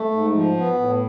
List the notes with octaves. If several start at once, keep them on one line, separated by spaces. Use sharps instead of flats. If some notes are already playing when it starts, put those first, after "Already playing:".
Already playing: A3
G#2
F3
B3
A2